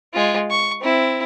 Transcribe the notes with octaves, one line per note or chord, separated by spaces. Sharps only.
G#3 F4
C#6
C4 E4